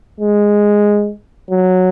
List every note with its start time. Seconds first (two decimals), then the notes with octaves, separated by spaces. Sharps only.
0.20 G#3
1.50 F#3